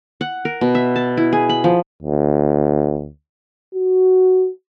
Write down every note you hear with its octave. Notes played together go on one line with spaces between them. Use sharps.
F#5
A#4
B2
E5
A5
E4
G#4
B5
F3
D2
F#4